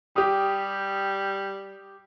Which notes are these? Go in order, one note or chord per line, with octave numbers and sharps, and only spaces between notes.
G3 G4 D#6